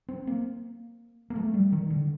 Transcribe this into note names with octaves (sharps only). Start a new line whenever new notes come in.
C4
A#3
A#3
A3
G3
D#3
D3